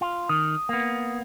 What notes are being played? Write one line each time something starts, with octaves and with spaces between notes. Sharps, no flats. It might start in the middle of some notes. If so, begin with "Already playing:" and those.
F4
D#3 D#6
A#3 B3